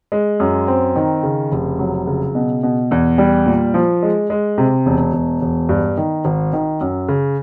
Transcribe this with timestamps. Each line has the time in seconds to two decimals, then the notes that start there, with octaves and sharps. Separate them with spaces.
0.12 G#3
0.40 F#2
0.68 C4
0.96 D#3
1.23 C#3
1.52 F1
1.79 F#3
2.07 C#3
2.35 B2
2.63 B2
2.91 E2
3.18 G3
3.46 A#2
3.74 F3
4.03 G#3
4.30 G#3
4.58 C3
4.86 E1
5.13 E1
5.41 E1
5.69 G2
5.97 D#3
6.25 G#1
6.53 D#3
6.81 F#2
7.08 C#3